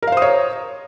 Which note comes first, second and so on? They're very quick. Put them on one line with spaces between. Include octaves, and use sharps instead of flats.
A#4 F5 C5 D#6 C#5